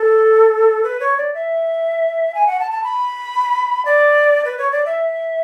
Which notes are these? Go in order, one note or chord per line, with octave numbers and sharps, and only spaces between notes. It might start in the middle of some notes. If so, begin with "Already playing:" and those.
Already playing: A4
B4
C#5
D5
E5
G#5
F#5
A5
A5
B5
D5
B4
C#5
D5
E5